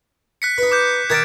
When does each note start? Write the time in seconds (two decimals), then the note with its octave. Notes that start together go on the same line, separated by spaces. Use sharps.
0.42 F#6 B6 C#7
0.58 D#4 B4
0.72 D6 F#6 G6
1.10 D#3 A#4 A5 G#6 A6 D7